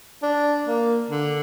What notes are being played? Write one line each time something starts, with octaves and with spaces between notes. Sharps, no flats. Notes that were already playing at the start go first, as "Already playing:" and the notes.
D4
A#3
D3